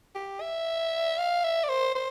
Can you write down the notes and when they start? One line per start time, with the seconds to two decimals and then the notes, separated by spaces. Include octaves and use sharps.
0.15 G4
0.41 E5
1.18 F5
1.44 E5
1.64 D5
1.69 C5
1.95 C5